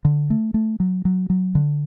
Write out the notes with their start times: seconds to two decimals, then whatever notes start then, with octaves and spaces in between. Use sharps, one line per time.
0.05 D3
0.30 A3
0.54 A3
0.80 F#3
1.05 F#3
1.30 F#3
1.55 D3